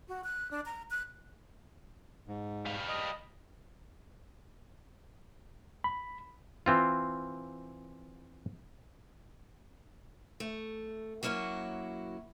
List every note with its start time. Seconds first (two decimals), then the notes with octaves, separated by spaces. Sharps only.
0.09 F#4
0.24 F#6
0.51 D4
0.66 A#5
0.91 F#6
2.28 G#2
2.66 G3 F5
2.88 D#5
5.84 B5
6.66 E3 C4 F4
10.40 A3
11.23 F#3 A#3 C#4 E4 F#4